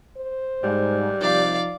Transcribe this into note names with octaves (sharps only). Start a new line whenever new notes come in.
C5
G#2 G3
C3 F3 D#4 D5 F5